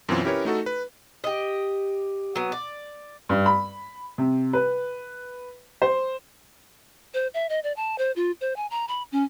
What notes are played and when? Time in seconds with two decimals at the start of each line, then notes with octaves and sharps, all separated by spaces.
0.09 F#2 B2 E3 C4 C#4 F4
0.24 C#4 E4 G4 A#4 B4 C#5
0.45 A3 D#4 F#4 A4
0.66 B4
1.24 G4 D#5
2.36 F#3 B3
2.52 D5
3.29 G2
3.46 B5
4.18 C3
4.53 B4
5.82 C5
7.14 C5
7.34 E5
7.49 D#5
7.63 D5
7.76 A5
7.98 C5
8.16 F4
8.41 C5
8.56 G#5
8.71 A#5
8.88 B5
9.12 C#4